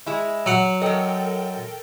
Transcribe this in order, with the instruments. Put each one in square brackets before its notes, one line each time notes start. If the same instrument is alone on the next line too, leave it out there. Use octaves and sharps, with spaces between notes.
[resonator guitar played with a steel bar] G#3 E4
[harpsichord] F#3 F#5
[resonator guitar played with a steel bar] F#2 D#5 [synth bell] A4 A#4 G5